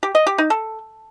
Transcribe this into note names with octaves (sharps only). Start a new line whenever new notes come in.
G4
D#5
G4
D#4
A4